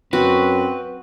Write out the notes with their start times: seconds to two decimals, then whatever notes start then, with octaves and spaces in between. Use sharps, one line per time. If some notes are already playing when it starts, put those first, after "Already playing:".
0.13 F#2 C4 F#4 B4